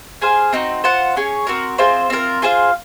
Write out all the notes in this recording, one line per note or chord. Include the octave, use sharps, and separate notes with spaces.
G#4 C5 F5 G#5
C4 D#4 F#4
F4 C5 F#5
C#4 G#4 C#5
C4 F#4 A#4
C4 F4 G#4 C5
C4 F4 A#4
F4 G#4 C5 F5